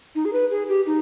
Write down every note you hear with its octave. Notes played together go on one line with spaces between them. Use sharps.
D#4
G#4
B4
G#4
G4
D#4